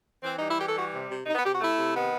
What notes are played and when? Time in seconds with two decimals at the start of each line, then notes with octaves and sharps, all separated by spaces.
0.24 E3 C4
0.35 D#4
0.41 G3
0.47 E4
0.58 E3 G4
0.67 A4
0.75 G3 F#4
0.92 C3
1.10 C3
1.26 C3 D#4
1.35 B3
1.44 C3 G4
1.52 F#4
1.61 A3 E4
1.77 C3
1.95 D#3 B3